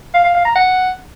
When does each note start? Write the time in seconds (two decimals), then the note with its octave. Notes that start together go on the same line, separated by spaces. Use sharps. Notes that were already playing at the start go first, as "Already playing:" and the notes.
0.14 F5
0.24 F5
0.35 F5
0.45 A#5
0.55 F#5